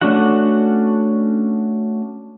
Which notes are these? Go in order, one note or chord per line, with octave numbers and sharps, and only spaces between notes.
A3 C#4 D4 F#4 F#5